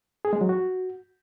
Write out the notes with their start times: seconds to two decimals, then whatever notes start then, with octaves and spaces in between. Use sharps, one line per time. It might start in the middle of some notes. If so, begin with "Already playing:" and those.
0.25 G#4
0.33 G#3
0.41 F#3
0.49 F#4